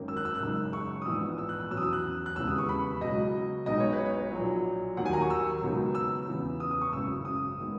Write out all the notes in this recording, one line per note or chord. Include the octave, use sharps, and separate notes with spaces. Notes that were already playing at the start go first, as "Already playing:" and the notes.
Already playing: G#1 F#2 D#3 A#3 C#4
E6
F#6
E6
F#6
F#1 F#2 C#3 G#3 D#4 E6
C#6
D#6
A#1 G#2 E3 B3 D#4 E6
E6
F#6
E6
E2 B2 F#3 C#4 E6
D#6
E6
F#6
F#6
E1 D#2 C#3 E3 B3 E6
D#6
C#6
B5
C#2 B2 F#3 D#5
B1 B2 G#3 B3 D#4 D#5
C#5
B4
C#5
A#1 A#2 F#3
D#2 D#3 F#3 F#5
G#5
A#5
C#6
E6
C#2 B2 F#3 B3 D#4
E6
E2 C#3 E3 B3
D#6
D#6
C#6
G#1 F#2 C#3 E6
D#6
D#3 G#3 B3